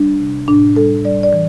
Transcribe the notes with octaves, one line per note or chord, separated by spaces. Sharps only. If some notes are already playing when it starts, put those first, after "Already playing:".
Already playing: G3 D4
C3
A2 D4
G3 A4
G3 D5
D5
E3